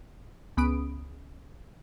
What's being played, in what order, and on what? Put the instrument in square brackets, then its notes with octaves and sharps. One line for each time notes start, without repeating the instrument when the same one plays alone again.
[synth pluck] C#2 B3 B5 D#6 D7